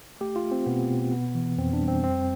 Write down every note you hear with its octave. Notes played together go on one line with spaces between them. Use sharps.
A3 G4
F4
A3
C4
B2 B3
B2
B3
E3
F2 C4
D4
G3
C4
F2 C4